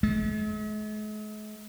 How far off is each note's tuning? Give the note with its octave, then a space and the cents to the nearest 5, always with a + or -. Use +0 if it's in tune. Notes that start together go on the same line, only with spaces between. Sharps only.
G#3 +45